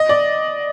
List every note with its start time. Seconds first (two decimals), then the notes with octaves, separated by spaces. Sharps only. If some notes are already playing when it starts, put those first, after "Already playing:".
Already playing: D#5
0.09 D5